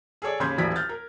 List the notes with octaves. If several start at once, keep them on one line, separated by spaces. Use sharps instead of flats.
G#4 A4 C#5 D5
D#2 C#3 B5 C6 G6 G#6
D#1 A1 F#2 D5 G#6 B6
F6 G6 A6
A#4